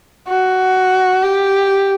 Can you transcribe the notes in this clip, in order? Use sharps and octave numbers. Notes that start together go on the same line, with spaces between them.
F#4
G4